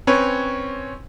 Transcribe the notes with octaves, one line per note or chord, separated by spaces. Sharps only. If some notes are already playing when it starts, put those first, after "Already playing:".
C4 C#4 B4 C#5